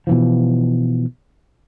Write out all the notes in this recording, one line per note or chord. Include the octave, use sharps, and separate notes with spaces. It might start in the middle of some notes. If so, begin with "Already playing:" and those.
B2 E3 F3